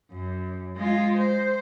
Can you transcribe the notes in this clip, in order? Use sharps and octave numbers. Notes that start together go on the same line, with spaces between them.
F#2
G#3 F4
C5